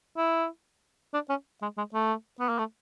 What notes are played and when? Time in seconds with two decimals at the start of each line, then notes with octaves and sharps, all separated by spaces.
0.17 E4
1.14 D4
1.30 C#4
1.62 G#3
1.78 G#3
1.94 A3
2.40 B3
2.49 A#3
2.59 A3